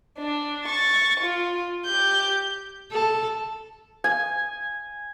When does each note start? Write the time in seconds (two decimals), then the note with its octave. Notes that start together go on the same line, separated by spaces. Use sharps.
0.19 D4
0.66 C#6 A6
1.20 F4
1.86 G4 G6
2.92 A4
4.04 G#5